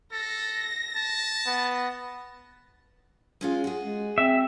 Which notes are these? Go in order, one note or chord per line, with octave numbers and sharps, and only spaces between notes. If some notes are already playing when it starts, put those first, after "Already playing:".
A4 A#6
A5
B3
G#3 C#4 F4
F#4 G#4
G#3
C4 E5